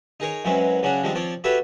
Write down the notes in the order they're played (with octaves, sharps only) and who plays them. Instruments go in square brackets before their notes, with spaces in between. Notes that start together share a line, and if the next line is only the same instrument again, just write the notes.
[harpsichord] D#4 G#4 A#4 C#5
F#2 E3 F#3 G#3 C4 C#4
C#3 F#3 C#4 D4 F#4
F3 G3 G#3 C4 D4
F3 C4 C#5 D5
F#4 G4 A4 B4 C#5 E5